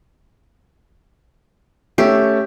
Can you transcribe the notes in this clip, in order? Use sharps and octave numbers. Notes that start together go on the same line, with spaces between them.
A3 C#4 G4 E5